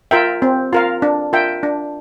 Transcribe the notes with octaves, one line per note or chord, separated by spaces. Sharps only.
F4 A#4 E5 G5
C4
F4 A#4 F5
D4
F4 A#4 E5 G5
D4